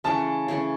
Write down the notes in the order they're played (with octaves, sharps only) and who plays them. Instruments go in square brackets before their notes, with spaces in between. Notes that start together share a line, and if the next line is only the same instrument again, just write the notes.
[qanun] C#3 E3 A3 C#4 [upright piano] A5
[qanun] C#3 E3 A3 C#4